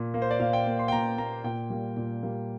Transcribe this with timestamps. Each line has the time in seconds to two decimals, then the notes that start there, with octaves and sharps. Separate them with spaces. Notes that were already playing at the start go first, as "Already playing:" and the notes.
Already playing: A#2 A#3
0.14 A#3
0.22 C5
0.31 D5
0.40 A#2 F5
0.53 G5
0.67 A#3
0.79 C6
0.88 G5
0.92 A#2 A#5
1.18 A#3 A#5
1.44 A#2 G5
1.70 G3 A#3
1.97 A#2
2.23 G3 A#3